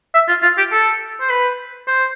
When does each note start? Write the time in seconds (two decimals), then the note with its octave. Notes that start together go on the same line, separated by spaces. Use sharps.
0.14 E5
0.28 F4
0.42 F4
0.58 G4
0.72 A4
1.21 C5
1.30 B4
1.87 C5